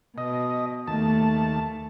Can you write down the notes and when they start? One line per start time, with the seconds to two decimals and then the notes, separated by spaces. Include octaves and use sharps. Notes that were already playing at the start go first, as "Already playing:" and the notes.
0.18 B2 D#5
0.87 D#2 A3 A5